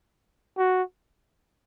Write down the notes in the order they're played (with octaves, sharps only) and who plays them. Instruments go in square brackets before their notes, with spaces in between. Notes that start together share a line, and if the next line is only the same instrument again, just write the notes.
[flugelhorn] F#4